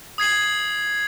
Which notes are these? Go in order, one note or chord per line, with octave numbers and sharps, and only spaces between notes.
D#6 G#6 C7 F#7